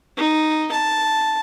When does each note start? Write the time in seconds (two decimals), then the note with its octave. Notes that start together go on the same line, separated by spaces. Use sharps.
0.17 D#4
0.71 A5